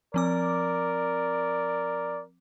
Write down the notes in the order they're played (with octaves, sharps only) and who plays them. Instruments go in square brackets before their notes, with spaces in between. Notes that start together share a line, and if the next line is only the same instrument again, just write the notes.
[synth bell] F3 C4 D6 [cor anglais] A#4 [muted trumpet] D5